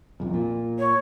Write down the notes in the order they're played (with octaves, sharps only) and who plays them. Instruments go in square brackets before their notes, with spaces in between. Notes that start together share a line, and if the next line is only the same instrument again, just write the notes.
[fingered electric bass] B1 F2
A#2
[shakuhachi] C#5